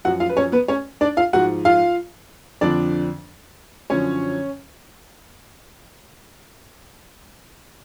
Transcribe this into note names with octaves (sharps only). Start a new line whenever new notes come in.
F#2 F3 F#4 F#5
F4 F5
B4
C#4 C#5
B3 B4
C#4 C#5
D4 D5
F4 F5
G#2 F3 F#4 F#5
F4 F5
F2 D3 F3 D4 D5
F#2 D3 F3 C#4 C#5